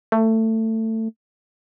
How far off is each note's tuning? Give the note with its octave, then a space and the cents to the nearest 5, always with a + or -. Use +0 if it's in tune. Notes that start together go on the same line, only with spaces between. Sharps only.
A3 +20